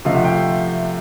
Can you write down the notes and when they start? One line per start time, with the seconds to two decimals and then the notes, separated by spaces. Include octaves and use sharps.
0.05 C3 F3 A3 D#5 F5
0.15 E5 F#5
0.24 F5 G5